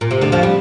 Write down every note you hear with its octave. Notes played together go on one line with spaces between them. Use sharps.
A#2
C3
D2 D3
F2 F3
G3